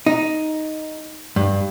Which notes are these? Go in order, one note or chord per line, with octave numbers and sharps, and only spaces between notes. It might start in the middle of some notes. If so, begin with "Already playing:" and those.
D#4
G2